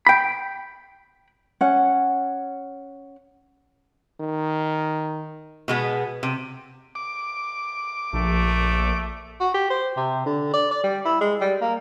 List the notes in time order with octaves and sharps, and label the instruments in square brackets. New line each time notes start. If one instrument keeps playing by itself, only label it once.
[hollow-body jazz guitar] G5 B5
[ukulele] C#4 F#5
[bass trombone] D#3
[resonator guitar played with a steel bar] B2 G#3 B3
C3
[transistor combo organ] D6
[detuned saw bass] A#1 [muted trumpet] A3
[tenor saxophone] F#4
G4
C5
C3
D3
D5
D5
G3
E4
G#3
G3
A#3